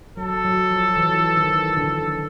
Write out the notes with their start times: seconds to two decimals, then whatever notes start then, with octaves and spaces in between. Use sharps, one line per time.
0.17 F#3 A4
0.44 F#3
0.70 F3
0.97 E3
1.37 D#3
1.77 D3